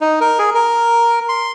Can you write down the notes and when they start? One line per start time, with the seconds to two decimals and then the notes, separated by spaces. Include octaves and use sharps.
0.01 D#4
0.21 A#4
0.39 G#4
0.54 A#4
1.29 C6